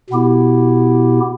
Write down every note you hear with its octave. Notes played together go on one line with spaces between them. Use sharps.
B2 B3 E4 G4